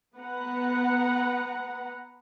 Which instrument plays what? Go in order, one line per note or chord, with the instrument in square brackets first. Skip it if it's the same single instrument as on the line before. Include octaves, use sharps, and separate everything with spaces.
[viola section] B3 B4 F#5 A#5